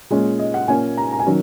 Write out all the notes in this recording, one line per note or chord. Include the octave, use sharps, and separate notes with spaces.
A#2 G#3 C#4
D#5
F#5
A#2 A#3 C#4 G#5
A#5
A#5
G#5
D#3 F#3 C#4